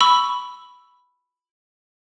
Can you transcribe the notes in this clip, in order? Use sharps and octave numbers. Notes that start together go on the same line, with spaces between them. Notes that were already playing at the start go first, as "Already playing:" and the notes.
B5 C#6 E6